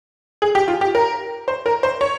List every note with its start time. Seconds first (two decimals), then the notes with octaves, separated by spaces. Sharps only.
0.42 G#4
0.55 G4
0.68 F4
0.81 G4
0.95 A#4
1.48 C5
1.66 A#4
1.83 C5
2.01 C#5